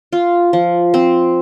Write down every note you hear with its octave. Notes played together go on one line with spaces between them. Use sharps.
F4
F3
C4